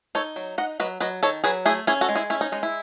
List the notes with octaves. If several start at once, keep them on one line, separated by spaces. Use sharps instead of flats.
D#4 A4 C#5
F#3
D#4 D#5 F#5
F#3 B4 D#5
F#3 B4 D#5
D#3 A4 C#5
F#3 G#4 B4
A3 E4 G#4
C#4 E4 G#4
F#4 A4
G#3
E4 G#4
C#4 E4
D#4
G#3 D#4
E4